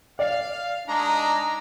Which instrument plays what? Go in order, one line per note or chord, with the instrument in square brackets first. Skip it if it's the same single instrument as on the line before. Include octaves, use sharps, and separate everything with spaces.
[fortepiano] D5 [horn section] F5
[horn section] G#3 A#5 [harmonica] D4 D#4